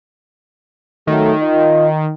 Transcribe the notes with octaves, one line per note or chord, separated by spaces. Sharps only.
D#3 F#3 A3
F4 D#5